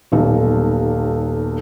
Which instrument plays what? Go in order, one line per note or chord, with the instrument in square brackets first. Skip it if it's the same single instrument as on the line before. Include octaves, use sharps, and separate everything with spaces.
[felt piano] D#1 B1 G3